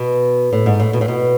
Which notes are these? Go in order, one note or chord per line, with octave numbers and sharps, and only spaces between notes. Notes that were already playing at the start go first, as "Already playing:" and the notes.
Already playing: B2
A2
G#2
A2
B2
A2
B2